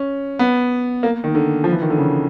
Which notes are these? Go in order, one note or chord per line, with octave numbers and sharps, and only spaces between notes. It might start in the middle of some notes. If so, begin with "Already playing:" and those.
Already playing: C#4
B3
A#3
D#3
D3
F3
E3
D#3
D3
C#3